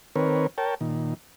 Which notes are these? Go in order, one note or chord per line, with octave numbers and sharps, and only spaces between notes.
D#3 C4 A#4 B4 C#5
A#4 C#5 G5 A5
A#2 D#3